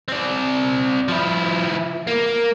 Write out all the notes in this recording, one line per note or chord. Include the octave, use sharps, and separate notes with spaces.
C4 D5
F3 E4
A#3